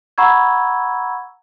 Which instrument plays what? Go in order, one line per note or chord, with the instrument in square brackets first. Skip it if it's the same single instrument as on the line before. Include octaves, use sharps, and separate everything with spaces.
[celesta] F#5 A#5 B5 C#6 E6 G#6